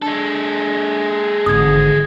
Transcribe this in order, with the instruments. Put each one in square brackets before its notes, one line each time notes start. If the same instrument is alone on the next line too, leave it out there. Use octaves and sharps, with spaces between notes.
[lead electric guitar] G#3 A4 [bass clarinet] D4
[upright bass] G#1 E3 [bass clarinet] D3 [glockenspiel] D#6 G#6